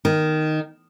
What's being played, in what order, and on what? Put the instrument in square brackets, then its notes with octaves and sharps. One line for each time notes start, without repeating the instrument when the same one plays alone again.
[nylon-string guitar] D#3